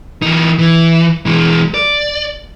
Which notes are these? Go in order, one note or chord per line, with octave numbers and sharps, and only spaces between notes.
E3 D#4
E3
E3 G#3
D5